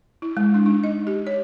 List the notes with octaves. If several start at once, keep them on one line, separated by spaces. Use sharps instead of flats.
E4
G#3
D4
D#4
D#5
G4
C#5